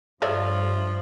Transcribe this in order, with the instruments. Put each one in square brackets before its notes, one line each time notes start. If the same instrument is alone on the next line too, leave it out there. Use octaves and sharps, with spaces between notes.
[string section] G2 [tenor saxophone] F3 [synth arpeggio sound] A4 C#5 [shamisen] D5 E5 F5